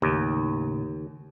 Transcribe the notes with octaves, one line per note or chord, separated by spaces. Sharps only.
D#2 A2 C#3 D#4